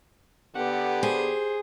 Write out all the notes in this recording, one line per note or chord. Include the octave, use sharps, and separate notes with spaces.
D3 B3 G4 F#5
G#4 C5